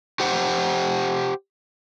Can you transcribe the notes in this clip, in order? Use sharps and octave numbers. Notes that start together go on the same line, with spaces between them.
G4 C5 F#5